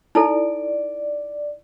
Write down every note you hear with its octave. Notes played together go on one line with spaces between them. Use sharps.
D#4 E4 A4 D5